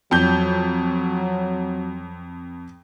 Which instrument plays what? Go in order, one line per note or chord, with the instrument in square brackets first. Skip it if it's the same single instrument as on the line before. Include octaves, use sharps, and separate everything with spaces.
[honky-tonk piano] F2 G6 [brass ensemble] F#3